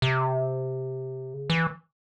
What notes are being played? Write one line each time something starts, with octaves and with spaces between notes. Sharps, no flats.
C3
C#3
E3